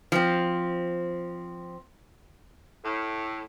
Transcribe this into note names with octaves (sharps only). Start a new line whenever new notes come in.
F3 C4
A2